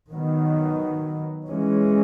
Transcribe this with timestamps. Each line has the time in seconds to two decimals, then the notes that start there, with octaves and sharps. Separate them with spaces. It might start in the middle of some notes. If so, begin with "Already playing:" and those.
0.11 D#3 F#3 B3
1.47 E3 G#3 C#4